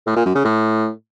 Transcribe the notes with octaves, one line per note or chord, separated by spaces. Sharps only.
A2
A#2
F#2
C#3
A2